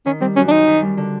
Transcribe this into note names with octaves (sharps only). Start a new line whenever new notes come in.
D#3 C#4
G3 C4
F#2 C#4
D4
C4 D#4
D#3
G3
D3